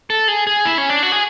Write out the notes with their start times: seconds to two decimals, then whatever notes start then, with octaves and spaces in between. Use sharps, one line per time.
0.10 A4
0.28 G#4
0.47 G#4
0.65 E4
0.78 C#4
0.89 D4
1.03 F#4
1.12 G#4